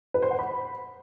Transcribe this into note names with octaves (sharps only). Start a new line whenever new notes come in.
B4
C5
F#5
B5